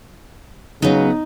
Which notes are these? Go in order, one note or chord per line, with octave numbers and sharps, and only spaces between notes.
C#3 F#3 B3 D#4